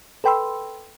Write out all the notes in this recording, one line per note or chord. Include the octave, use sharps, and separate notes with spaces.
A4 B4 G5 B5 C6 E6